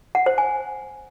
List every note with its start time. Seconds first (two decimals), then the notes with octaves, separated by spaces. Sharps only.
0.15 F#5
0.26 C5
0.38 G#5